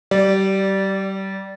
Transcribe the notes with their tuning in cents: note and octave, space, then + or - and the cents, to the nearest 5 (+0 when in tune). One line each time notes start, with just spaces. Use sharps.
G3 -25 D5 +0